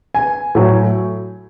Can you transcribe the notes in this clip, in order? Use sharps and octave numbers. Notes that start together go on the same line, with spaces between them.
G#5
A2 F#3